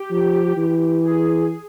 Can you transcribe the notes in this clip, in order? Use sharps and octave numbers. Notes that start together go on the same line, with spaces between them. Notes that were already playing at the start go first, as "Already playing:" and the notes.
Already playing: G4
F3
E3
G#4